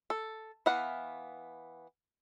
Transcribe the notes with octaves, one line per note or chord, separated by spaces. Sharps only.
A4
E3 B3 F5 F#5